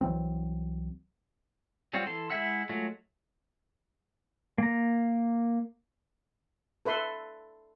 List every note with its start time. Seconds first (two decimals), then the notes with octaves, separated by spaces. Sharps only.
0.01 C2 E3 F#3 C4
1.93 F#3 G3 C4 F4 F#4
2.06 E3 A4 C6
2.30 G#3 E4 E5 F#5 E6
2.69 F#3 G#3 A3 F4
4.58 A#3 A#5
6.85 A4 B4 E5 C6